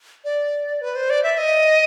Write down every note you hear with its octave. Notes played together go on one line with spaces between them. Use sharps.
D5
B4
C5
D5
E5
D#5